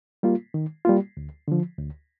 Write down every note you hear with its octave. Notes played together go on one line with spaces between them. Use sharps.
G3 A#3 F4
D#3
G3 A#3 F4
D2
D3 F3
D2